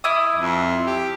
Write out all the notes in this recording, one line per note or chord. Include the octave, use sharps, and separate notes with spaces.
E4 D6 D#6
F2
G4